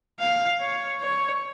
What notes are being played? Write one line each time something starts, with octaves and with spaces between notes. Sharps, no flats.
F5
C#5
C#5